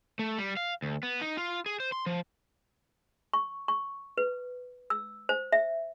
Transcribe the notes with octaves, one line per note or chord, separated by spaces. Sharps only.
A3
G3
F5
D2
B3
D#4
F4
G#4
C5
C6
F3
C#6
C#6
B4
E6
C5
E5